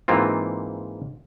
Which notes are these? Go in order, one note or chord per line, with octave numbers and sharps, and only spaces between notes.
G#2 E3 A#3 C4 F4